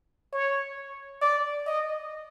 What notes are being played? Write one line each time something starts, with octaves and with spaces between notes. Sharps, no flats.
C#5
D5
D#5